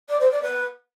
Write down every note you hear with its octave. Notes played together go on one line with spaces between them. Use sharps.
D5
C5
D5
B4